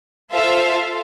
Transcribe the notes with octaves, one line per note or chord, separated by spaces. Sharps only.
F4 A4 C5 E5 F5